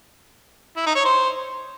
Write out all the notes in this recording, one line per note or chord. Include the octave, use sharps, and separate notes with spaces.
E4
D#4
C#5
C5